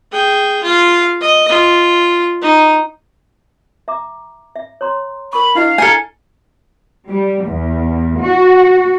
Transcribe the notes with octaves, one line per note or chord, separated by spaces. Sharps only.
G#4 G5
F4 F5
D#5
F4
D#4
E5 A#5 D6
E5
C#5 A#5 C6
A#4 B5 C#6
D4 E4 D#5 F5
A4 A#4 G#5
G3
E2
F#4